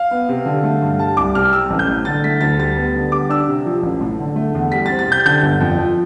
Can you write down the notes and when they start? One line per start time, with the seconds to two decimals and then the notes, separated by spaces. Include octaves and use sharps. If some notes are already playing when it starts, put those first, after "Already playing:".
Already playing: F5
0.11 B3
0.29 C3
0.45 D3
0.64 A3
0.82 G2
0.99 G3 A5
1.17 C2 D6
1.35 C3 F6
1.53 G3 E6
1.70 A1
1.79 G6
1.88 A2
2.05 D3 A6
2.24 A3 B6
2.41 D2 A6
2.58 G3 A6
2.77 B3
2.95 D3
3.12 G3 D6
3.29 D4 E6
3.48 C3
3.66 F3
3.83 A1
4.01 A2
4.19 D3
4.36 A3
4.55 E2
4.72 G3 B6
4.86 A6
4.90 C4
4.99 A6
5.08 C3 G6
5.26 D3 G6
5.43 G1
5.60 F2
5.78 F3